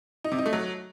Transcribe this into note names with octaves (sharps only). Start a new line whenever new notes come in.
D#4
C3
D#4
A3
F#3